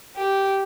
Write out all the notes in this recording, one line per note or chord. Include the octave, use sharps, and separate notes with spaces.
G4